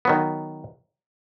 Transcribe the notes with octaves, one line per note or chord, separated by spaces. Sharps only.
D#3 F#3 B3